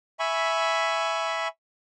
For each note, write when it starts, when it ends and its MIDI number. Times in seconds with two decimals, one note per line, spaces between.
0.19 1.48 76
0.19 1.48 80
0.19 1.48 83
0.19 1.48 85